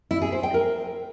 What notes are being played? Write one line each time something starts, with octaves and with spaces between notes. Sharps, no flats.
E4
G#4
C5
G5
A#4